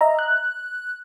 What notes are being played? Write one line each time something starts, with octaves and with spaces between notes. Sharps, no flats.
D#5 E5 A#5
F#6